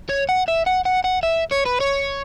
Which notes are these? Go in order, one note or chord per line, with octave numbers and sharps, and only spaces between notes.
C#5
F#5
E5
F#5
F#5
F#5
E5
C#5
B4
C#5